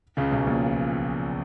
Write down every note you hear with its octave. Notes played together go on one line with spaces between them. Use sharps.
C#2 C#3
B1 B2
A#1 A#2